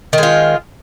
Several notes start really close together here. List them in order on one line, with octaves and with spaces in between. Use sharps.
D#3 G#3 F4